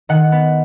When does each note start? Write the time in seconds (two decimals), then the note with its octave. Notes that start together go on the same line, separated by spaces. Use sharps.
0.09 D#3 F#5
0.32 B3